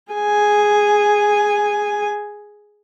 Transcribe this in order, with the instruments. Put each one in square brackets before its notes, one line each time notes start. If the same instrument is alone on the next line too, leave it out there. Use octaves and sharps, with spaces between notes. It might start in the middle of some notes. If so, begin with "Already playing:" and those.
[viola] G#4 G#5